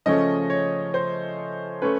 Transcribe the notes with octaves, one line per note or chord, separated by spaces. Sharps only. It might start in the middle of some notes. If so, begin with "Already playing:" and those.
C#3 F3 A3 C#4 D#5
C#5
C5
A3 C#4 B4